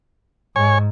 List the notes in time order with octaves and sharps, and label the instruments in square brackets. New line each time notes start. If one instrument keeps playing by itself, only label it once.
[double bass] G#2 [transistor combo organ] C#5 G#5